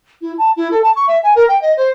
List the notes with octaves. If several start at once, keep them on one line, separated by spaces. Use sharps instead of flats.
E4
A5
E4
A4
A5
C#6
E5
G#5
A#4
G5
D#5
C5